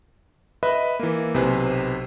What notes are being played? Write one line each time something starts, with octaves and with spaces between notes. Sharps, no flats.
B4 D#5 E5 B5
E3 A#3
B1 C3 B4 C5 G#5